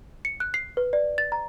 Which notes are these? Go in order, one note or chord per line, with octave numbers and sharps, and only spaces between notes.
C#7
F#6
C7
B4
D5
A6
A#5